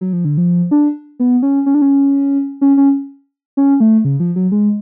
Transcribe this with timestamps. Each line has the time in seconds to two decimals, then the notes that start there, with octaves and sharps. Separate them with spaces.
0.01 F#3
0.13 F3
0.25 D3
0.37 F3
0.71 D4
1.20 B3
1.43 C#4
1.66 C#4
1.75 D4
1.82 C#4
2.61 C#4
2.77 C#4
3.57 C#4
3.80 A3
4.05 C#3
4.20 F3
4.36 F#3
4.52 G#3